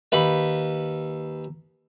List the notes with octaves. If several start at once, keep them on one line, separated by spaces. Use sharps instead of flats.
D#2 B4 B5